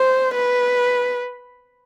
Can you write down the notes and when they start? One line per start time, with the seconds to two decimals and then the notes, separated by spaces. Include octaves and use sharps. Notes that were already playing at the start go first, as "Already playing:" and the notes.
Already playing: C5
0.34 B4